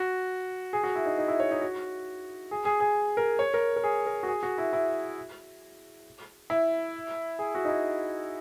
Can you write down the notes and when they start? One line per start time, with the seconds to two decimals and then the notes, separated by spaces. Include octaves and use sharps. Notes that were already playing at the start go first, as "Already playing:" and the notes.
Already playing: F#4
0.73 G#4
0.84 F#4
0.96 E4
1.06 D#4
1.18 D#4
1.28 E4
1.40 C#5
1.51 D#4
1.62 F#4
2.51 G#4
2.65 G#4
2.80 G#4
3.17 A#4
3.39 C#5
3.54 A#4
3.76 A#4
3.84 G#4
4.07 A#4
4.23 F#4
4.28 G#4
4.43 F#4
4.58 E4
4.73 E4
6.50 E4
7.39 G#4
7.55 F#4
7.65 D#4
7.68 E4